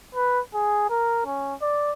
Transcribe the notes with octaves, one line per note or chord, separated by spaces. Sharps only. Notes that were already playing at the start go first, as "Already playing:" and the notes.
B4
G#4
A#4
C#4
D5